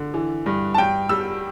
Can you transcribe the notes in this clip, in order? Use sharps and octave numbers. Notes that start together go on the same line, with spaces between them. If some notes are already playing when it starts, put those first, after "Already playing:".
Already playing: D3
E3
G2
A5
G2 G5
G3 E6